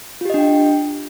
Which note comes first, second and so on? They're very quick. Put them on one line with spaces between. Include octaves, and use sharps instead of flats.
F4 G4 D#5 D4 G5